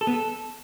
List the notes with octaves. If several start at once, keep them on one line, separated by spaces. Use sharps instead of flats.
A4
B3
A4